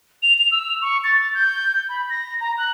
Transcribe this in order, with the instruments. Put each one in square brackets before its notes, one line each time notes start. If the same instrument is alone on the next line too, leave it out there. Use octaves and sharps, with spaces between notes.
[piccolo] F7
F7
E6
C#6
A6
G6
B5
A#6
A#5
F#6